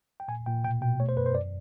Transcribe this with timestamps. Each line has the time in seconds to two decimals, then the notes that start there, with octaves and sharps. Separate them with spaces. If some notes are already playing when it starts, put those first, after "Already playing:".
0.20 G5
0.28 A#2 G#5
0.46 A#2 G5
0.64 B2 G5
0.82 B2 G5
1.00 A3 C#5
1.09 C5
1.17 F#2 B4
1.26 C5
1.35 F#2 D5